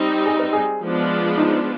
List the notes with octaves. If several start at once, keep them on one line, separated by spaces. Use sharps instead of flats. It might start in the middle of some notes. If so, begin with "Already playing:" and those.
Already playing: G3 C4 D#4
G#4
B4
G#4
F3 G#3 B3 D4 F4
D#4